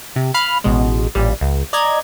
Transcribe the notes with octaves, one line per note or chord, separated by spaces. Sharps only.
C3
F5 B5 F6
A1 B2 G#3
A1 A#2 G3
C#2
D5 D#5 A#5 G#6